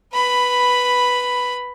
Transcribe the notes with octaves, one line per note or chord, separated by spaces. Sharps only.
B4 B5